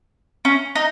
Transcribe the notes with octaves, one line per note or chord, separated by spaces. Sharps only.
C#4
D#4